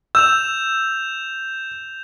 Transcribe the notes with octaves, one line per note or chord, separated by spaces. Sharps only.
E6 G6 E7 F7